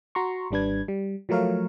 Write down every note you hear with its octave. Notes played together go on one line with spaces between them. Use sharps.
F#4 A#5 C6 C#6
G#1 G3 D4 B4 G#6
G3
F3 F#3 A3 A#4 C#5 F5